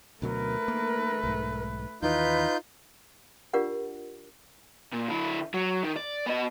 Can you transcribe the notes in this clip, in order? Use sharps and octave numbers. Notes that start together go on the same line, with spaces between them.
D2 B2 F#3 A3 A#4 B4
A#3
B1 G#2
D#2 D#3 E3 D#4 F4 B4 G6
D4 F4 G4 A#4 D5 F#5
A#2
D3 E4
F#3
D#3
D5
B3 D#5